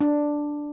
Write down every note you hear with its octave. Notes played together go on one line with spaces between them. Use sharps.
D4